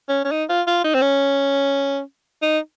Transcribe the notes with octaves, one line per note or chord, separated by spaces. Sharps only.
C#4
C#4
D#4
F4
F4
D#4
C4
C#4
D#4